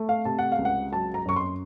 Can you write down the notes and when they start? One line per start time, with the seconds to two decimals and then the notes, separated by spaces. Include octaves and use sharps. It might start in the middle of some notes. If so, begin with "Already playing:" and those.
Already playing: A3
0.09 F5
0.25 C3 A5
0.39 F#5
0.52 F5
0.58 C#2
0.65 F#5
0.92 F#3 A5
1.14 A#5
1.25 F#2 C#6
1.36 C6